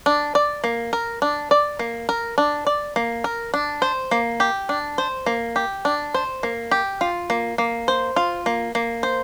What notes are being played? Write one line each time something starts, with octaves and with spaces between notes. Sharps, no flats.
D4
D5
A#3
A#4
D4
D5
A#3
A#4
D4
D5
A#3
A#4
D4
C5
A#3
G4
D4
C5
A#3
G4
D4
C5
A#3
G4
F4
A#3
A#3
C5
F4
A#3
A#3
C5